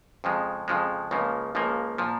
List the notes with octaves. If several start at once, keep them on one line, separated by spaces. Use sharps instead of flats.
F2 C#3 F3 G#3
F2 C#3 F3 G#3
C#2 C#3 F3 A#3
C#2 C#3 F3 A#3
A#2 F3